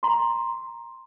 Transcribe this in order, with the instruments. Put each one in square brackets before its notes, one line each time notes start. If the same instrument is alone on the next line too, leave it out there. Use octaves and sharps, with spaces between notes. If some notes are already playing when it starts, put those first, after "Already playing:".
[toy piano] A#5 C6